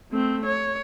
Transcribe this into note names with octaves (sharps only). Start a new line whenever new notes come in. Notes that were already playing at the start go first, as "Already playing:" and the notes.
A3 C4
C#5